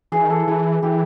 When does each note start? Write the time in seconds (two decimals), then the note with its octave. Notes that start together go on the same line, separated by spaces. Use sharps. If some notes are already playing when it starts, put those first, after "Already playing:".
0.12 E3 G#4
0.24 D#3
0.30 E3 A4
0.47 E3 G#4
0.82 E3 G4